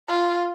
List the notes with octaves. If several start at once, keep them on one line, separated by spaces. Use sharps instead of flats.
F4